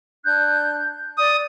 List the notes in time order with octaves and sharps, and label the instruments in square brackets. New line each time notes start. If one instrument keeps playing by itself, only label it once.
[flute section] D4 F#6 G6
[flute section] D5 [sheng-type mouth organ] D#6